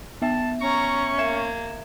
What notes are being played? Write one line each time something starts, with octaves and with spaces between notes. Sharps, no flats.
B3 E5 A5
C#4 A#5 C#6
A#3 E5 G#6 E7